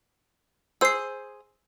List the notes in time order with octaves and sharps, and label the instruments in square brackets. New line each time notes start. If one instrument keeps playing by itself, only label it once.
[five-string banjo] G#4 C5 [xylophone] E6 C7